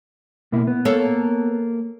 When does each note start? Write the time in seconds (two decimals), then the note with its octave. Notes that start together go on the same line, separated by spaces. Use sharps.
0.52 B2 A#3 E4
0.67 B3
0.85 A#3 A4 C#5